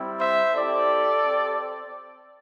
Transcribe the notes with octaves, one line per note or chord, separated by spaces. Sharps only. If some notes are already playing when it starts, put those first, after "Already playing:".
Already playing: G3 C4 E4
C5 E5
C4 E4 G4 A4 D5
C4 G4